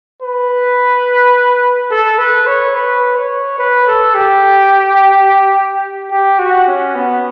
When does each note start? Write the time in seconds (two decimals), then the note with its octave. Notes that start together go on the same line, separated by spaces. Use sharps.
0.22 B4
1.91 A4
2.18 B4
2.47 C#5
2.75 B4
3.16 C#5
3.58 B4
3.87 A4
4.15 G4
6.11 G4
6.39 F#4
6.68 C#4
6.95 B3